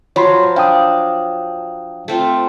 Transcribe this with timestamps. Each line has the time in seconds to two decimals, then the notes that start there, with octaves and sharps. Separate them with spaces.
0.16 F3 F#3 C#5 B5 C6
0.56 D4 F5 G5 D#6
2.08 A3 C4 F4